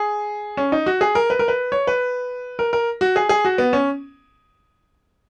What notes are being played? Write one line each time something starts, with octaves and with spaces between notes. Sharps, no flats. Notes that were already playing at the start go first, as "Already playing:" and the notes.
Already playing: G#4
C#4
D#4
F#4
G#4
A#4
B4
A#4
B4
C#5
B4
A#4
A#4
F#4
G#4
G#4
F#4
B3
C#4